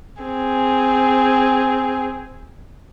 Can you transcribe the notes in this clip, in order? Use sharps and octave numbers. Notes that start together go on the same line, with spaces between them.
C4 G#4